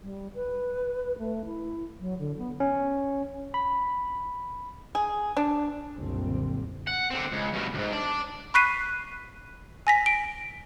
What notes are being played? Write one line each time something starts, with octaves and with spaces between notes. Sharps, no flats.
G3
B4
A3
E4
F#3
D3
B3
C#4
B5
G#4
D4
F#1 C2 A#2 D3 G3 C4
F#5
D3 C4
C#2
G2 B2
C#2 G#2
D5 A5
B5 C#6 F#6 B6 C7 D#7
G#5 A#6 B6
D7